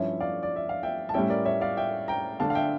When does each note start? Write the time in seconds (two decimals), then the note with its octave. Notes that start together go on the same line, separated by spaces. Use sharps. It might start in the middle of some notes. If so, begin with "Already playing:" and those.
Already playing: G2 F3 C#4 E4 C#5 E5
0.20 D5 F5
0.43 D5
0.56 E5
0.69 F5
0.83 E5 G5
1.09 A5
1.14 A2 G3 C#4 E4 E5 G5
1.30 A#4 D5
1.45 C#5 E5
1.61 D5 F5
1.77 E5 G5
2.08 G5 A#5
2.40 D3 A3 D4 F5 A5
2.50 F5
2.55 E5 G5